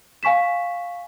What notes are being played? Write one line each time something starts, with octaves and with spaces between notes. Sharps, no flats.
F5 G#5 C#6 B6 E7